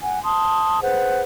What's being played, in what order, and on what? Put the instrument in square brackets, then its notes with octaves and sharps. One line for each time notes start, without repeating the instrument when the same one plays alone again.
[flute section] F#5 G#5
A5 C6 D#6
G#4 B4 C5 F#5